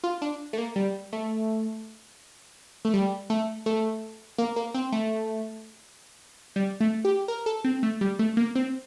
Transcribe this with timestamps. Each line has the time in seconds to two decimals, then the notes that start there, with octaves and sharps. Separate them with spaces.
0.04 F4
0.22 D4
0.53 A3
0.58 A#3
0.76 G3
1.13 A3
2.85 A3
2.94 G3
3.30 A3
3.66 A3
4.38 A#3
4.56 A#3
4.74 C4
4.92 A3
6.56 G3
6.80 A3
7.05 G4
7.28 A#4
7.46 A4
7.65 C4
7.83 A3
8.01 G3
8.19 A3
8.37 A#3
8.55 C4